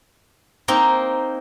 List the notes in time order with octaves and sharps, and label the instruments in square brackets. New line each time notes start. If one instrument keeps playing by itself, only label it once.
[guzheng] A#3 C4 D#4